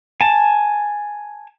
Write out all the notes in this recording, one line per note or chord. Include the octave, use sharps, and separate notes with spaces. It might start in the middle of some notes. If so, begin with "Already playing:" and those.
G#5 A5